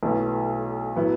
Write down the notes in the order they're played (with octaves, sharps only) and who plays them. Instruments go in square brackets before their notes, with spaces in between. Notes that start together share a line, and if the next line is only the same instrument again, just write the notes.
[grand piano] B1 B2 A3 E4
A2 F#3 B3 E4